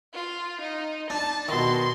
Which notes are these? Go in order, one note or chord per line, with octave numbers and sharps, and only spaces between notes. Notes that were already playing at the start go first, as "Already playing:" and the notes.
F4
D#4
D4 A5
B2 D#3 C6